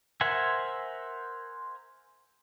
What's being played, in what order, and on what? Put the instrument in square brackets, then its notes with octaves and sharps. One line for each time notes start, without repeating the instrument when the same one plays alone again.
[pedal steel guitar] A#4 C5 E5 F#5 G#5